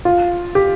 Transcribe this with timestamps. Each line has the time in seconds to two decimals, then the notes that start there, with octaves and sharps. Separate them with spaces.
0.05 F4
0.55 G4